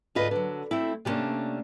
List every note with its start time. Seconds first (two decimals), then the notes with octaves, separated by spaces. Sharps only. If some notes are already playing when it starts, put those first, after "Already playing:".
0.15 D2 G#2 F4 B4 D#5
0.31 D3 F#3
0.71 A3 C4 E4
1.05 C3 G3 A3 A#3 C#4 D4